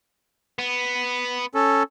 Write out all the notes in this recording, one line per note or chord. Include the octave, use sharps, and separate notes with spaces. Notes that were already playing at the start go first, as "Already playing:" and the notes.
B3
C#4 A4